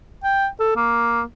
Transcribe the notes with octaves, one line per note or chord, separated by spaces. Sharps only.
G5
A4
A#3